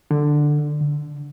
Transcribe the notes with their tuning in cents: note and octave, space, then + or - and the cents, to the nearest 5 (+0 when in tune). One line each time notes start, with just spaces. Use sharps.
D3 +10
D3 -15